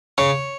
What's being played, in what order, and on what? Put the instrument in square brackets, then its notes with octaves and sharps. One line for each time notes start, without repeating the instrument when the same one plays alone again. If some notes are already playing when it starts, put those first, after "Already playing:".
[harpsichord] C#3 C#5